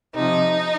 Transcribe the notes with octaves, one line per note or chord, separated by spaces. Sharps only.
C3 F3 D#4